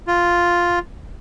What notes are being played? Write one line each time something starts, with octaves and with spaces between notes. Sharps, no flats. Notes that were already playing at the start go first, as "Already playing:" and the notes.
F4